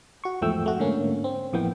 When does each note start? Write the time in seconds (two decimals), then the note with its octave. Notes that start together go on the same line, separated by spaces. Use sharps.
0.24 F#4 C#6
0.41 E2 G#2 F3 A3 G5 E6
0.64 F2 A3 F#4
0.79 G#2 D3 A3 A#3 C#4
1.24 C4
1.53 A1 F2 E3 A#3 B3 G5